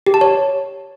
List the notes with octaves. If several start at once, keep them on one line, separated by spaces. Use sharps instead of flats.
G4
A5
C#5